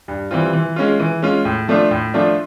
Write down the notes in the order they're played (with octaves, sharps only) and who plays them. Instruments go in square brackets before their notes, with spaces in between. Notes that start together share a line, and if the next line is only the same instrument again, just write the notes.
[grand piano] G2
E3 G3 C4 F4
E3
G#3 C#4 F4
E3
G#3 C#4 F4
A2
F3 A3 D4 F4
A2
F3 A3 D4 F4